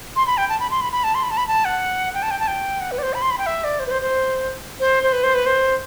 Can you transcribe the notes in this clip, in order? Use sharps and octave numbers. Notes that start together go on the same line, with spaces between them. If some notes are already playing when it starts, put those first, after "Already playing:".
C6
B5
G5
A5
B5
C6
B5
B5
A5
C6
B5
A5
B5
A5
F#5
G5
A5
G5
A5
G5
F#5
B4
D5
C5
B5
C6
B5
G5
E5
D5
C5
B4
C5
C5
C5
C5
B4
C5
B4
C5